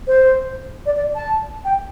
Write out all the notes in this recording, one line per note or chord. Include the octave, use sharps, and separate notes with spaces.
C5
D5
D5
A5
G5